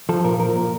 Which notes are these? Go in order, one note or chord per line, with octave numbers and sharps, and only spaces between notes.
F3 A4
A#2 A#4
F3 A#4
A#2